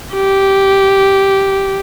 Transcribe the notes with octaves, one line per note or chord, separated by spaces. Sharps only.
G4